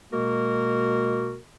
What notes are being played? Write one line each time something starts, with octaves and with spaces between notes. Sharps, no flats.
B2 G#3 A#3 F#4 A#4